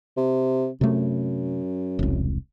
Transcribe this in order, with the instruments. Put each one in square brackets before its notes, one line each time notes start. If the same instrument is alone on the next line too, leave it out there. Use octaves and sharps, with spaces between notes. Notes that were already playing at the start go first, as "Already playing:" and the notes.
[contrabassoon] C3
[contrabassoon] F#2 [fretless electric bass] C3 A3
[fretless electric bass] E1 C2